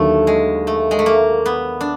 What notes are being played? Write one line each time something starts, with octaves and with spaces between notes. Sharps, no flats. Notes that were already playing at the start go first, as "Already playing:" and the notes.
Already playing: D#2 D3 F#3 A3
G#3
A3
G#3
A3
A#3
B3
D4